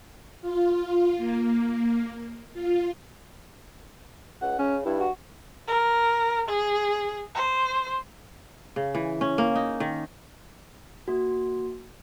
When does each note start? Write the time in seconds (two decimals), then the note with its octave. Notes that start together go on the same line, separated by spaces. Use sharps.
0.42 F4
1.17 A#3
2.54 F4
4.42 C#2 F#5
4.59 C#3 C#4
4.85 G2 E4
5.00 F#4
5.67 A#4
6.48 G#4
7.35 C5
8.76 C#3
8.95 E3
9.21 C#4
9.38 A#3
9.55 D#4
9.80 D#3
11.08 A#3 F#4